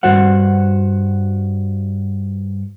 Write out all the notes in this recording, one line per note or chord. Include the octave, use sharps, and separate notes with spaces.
G2 F#4 C5 F#5